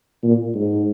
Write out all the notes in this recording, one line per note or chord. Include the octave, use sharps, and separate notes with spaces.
A#2
G#2